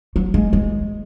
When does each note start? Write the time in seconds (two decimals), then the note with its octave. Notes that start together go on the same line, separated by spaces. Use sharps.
0.16 F#3
0.34 G#3
0.53 G#3